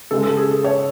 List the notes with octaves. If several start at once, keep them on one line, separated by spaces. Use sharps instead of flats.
C#3 G#3 A4
A4
G#4
A4
C#5